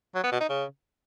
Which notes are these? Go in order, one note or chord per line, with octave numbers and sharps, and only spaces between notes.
F#3
B3
B2
D#4
C#3